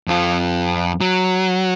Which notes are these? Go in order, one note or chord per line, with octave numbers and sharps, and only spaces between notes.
F2 F4
F#3